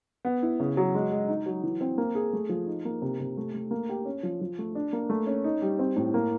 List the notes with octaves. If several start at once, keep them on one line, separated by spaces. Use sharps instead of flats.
B3
E4
C#3
F#3
G#3
G#3
D#4
F#3
E3
C4
A#3
G#4
A3
F3
D#4
A#3
C3
C3
A3
A3
A#3
G4
C#4
F3
F3
A3
D4
A#3
A3
C#4
D#4
G3
C4
A2
A#3